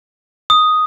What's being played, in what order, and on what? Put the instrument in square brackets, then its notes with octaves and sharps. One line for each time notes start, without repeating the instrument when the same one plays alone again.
[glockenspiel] D#6